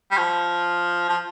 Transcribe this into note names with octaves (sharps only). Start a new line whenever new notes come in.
G3
F3
F3